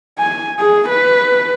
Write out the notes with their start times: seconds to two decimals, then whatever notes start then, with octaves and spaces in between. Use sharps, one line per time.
0.19 G#5
0.59 G#4
0.89 B4